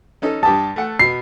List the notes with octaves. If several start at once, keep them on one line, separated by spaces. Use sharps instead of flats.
C#4 D#4 A4
G2 G4 A5 D#6
A3 F#5
B2 C7